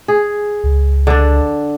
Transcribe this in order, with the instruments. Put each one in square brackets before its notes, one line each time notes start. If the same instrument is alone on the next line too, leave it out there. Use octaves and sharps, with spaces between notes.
[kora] G#4
[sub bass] C#2
[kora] D3 D4